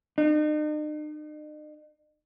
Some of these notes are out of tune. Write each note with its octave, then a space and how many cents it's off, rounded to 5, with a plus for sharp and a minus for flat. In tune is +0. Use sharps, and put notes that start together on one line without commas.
D#4 -45